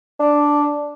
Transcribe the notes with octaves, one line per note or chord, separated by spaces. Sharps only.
D4